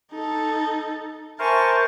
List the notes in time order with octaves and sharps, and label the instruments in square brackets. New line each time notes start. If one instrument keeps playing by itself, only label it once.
[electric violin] D#4 A4
[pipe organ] A#4 C5 [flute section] E5 G#5 C#6 [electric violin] A5